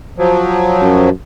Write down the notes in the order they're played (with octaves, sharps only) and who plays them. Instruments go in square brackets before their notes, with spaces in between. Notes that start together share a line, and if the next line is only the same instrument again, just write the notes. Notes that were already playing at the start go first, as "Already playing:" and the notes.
[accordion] F3 F#3
[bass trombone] F#2